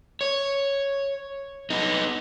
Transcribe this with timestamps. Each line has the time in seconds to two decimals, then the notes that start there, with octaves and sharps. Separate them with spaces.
0.21 C#5
1.70 B3 D#4